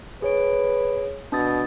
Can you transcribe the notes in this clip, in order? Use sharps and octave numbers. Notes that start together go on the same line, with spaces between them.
G#4 B4 C#5 D7
B2 D4 D#6 A6